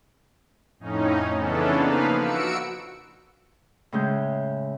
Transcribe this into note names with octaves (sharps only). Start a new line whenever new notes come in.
F2 A2 C#4 D#4
C#3 E3 B3 C#4 D4 A4
F3 A#3 D#4 B4 F5
F#4 E6 C#7 D7
A2 C#3 G#3 G6